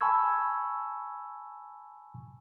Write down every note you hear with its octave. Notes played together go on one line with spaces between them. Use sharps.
G#5 A5 B5 C#6 E6 G#6